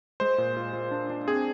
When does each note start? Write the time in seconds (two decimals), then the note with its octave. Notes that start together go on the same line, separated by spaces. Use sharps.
0.20 G#3 C5
0.38 A#2
0.57 F4
0.73 F4
0.91 D4
1.10 D4
1.27 C4 G#4